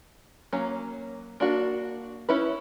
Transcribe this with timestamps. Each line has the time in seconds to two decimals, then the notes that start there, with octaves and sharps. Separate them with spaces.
0.53 F#3 A#3 C#4
1.40 A#3 D4 F#4
2.29 C#4 E4 B4